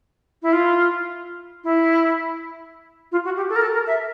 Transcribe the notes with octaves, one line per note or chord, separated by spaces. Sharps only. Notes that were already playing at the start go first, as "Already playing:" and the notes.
E4
F4
E4
F4
F#4
G4
A4
A#4
A4
A#4
E5